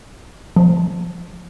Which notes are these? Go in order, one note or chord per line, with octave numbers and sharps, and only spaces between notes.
F3